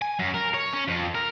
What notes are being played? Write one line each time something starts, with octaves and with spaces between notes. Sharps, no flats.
G#5
F#2
A#4
C#5
C#4
F2
A#4